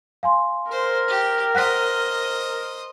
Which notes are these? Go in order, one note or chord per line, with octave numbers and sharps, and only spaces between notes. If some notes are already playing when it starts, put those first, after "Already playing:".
F5 G#5 C6
A#4 C5
G4
C5 D#5 F#5 F#6 B6